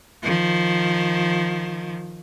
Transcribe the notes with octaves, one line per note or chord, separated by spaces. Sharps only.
D#3 F3